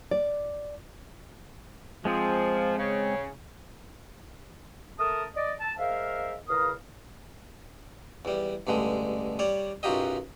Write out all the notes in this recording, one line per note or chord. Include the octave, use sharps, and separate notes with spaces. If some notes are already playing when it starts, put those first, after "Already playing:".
D5
F3 G#3 C4 G#4
C#3
A3 A#4 A5 D#6
D5 D#5
A5
G#3 A#4 C5 E5 F5
E2 C#3 A#4 F5 D#6
E2 G3
A1 G2 D3 G#3
G3 C#5 D5
B1 F#2 F#3 F4 G4 D#5